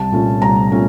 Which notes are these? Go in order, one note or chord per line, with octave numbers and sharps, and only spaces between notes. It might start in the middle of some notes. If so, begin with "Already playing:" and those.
Already playing: C2 A5
A#2 A3 C#4
C2 A#5
A#2 A3 C#4